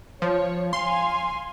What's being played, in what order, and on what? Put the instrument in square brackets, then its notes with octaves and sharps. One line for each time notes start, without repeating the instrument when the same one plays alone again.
[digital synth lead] F3 [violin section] C#5
[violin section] F5 G#5 [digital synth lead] C6